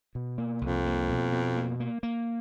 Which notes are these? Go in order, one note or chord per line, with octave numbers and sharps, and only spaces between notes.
B2
A#3
C2 F2
A#3
B2
B2
A#3
A#3
A#3